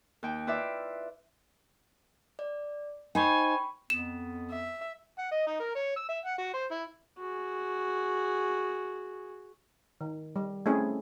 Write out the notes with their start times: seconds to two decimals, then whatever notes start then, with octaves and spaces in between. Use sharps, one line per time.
0.23 D#2 G5
0.47 E4 F4 B4 D5 E5
2.39 D5
3.15 D#4 C5 G5 G#5 B5 C#6
3.90 F2 B3 E7
4.51 E5
5.18 F#5
5.31 D#5
5.47 D#4
5.60 A#4
5.75 C#5
5.96 E6
6.09 E5
6.25 F#5
6.38 F#4
6.54 C5
6.71 E4
7.19 F#4 G#4
10.01 D#3
10.36 G3
10.66 A3 C4 C#4 E4 G#4